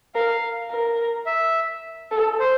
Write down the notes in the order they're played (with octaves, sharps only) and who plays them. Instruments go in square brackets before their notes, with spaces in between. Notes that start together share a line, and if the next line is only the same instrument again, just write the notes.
[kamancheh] A#4 [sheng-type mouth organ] F5
[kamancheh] A#4
[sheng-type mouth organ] E5
[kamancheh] A4
[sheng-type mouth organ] C5